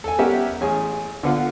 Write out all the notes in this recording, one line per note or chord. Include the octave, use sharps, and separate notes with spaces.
A4 G#5
G3 B3 C#4 G4 A#4 E5
A1 G#4 G#5
D3 B3 F4